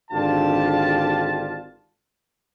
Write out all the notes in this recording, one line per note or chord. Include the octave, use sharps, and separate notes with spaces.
G#1 D3 D4 F4 G4 A5